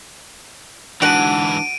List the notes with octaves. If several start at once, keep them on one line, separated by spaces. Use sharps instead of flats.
G#2 E3 D4 F#4 F#5 D7 D#7